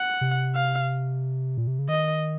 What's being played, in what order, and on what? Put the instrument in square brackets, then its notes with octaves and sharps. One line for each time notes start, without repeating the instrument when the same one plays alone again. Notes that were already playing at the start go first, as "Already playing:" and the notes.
Already playing: [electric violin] F#5
[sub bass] C3
[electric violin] F5
[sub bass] A#2
C3
C#3
[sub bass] D#3 [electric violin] D#5